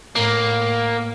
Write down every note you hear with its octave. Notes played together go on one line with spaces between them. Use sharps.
A2 A#3